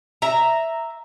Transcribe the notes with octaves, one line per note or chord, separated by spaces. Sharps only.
E5 A#5